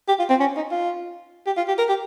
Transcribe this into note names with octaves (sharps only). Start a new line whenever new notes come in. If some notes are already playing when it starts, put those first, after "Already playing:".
G4
F4
C4
C#4
D#4
F4
G4
F4
G4
A#4
G4